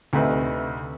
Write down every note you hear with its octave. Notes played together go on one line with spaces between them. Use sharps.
D2 C3 A3 D#4 B4 E5